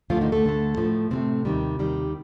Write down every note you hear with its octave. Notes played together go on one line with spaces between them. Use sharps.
D2 D3 F3 A3 F4
D#3 D#4
A3 A4
D2 D3 A3
A2 F3 A3
A2 C3 F3 A3 C4
D#2 D#3 G3
D#2 D#3 G3